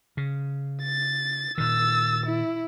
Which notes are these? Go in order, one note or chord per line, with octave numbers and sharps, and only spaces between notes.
C#3
A6
A#2 D#3 E6 A6
E4